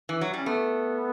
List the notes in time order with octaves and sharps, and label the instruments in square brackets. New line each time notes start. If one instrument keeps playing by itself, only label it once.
[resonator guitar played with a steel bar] E3
F#3
[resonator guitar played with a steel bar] G3 [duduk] C#4
[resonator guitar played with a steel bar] A3 [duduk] B3